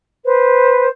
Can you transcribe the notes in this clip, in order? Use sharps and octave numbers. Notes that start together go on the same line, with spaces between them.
B4 C5